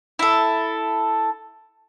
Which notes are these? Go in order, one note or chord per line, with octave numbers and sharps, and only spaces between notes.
E4 A4